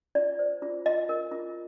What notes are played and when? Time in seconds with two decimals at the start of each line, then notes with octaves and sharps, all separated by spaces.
0.15 F4 D5
0.39 C5
0.62 F4
0.86 F4 D#5
1.09 A#4
1.32 F4